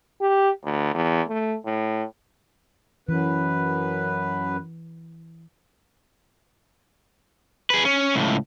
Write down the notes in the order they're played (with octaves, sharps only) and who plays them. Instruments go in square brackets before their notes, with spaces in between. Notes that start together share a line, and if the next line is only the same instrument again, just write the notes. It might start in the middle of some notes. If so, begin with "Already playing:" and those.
[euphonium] G4
D2
E2
A3
A2
[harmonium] F#2 B4 [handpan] E3
[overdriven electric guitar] G#4 B4
C#4
C#2 A2